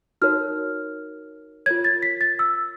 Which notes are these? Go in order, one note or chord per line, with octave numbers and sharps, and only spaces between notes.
D#4 F#4 A#4 C#5 F6
F4 A#4 C#5 G#6
A6
B6
A6
E6